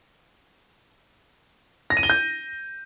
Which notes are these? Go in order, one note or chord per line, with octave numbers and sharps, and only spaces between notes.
A#6
D#7
G7
G6